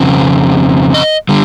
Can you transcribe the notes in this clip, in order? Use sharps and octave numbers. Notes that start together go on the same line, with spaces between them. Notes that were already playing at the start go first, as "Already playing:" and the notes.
Already playing: F2 C#3 C4
D#5
D3 G3